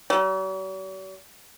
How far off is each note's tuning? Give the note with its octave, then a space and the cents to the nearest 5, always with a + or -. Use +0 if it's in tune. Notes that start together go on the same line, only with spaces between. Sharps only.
F#3 +45